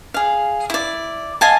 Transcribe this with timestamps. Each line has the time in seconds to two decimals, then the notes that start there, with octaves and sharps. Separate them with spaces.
0.14 G#4 F5
0.70 E4 D5
1.41 D#5 F5 G#5 A5